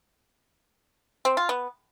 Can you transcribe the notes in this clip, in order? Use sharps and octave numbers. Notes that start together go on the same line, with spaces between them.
C4
F4
B3